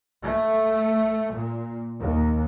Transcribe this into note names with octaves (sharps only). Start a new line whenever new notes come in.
A3
A#2
D#2